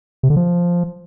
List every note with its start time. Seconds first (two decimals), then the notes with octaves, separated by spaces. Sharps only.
0.23 C3
0.30 D3
0.36 F3